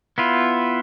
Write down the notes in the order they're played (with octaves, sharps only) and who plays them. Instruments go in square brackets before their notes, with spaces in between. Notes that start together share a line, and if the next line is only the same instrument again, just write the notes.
[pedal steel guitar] B3 E4 F4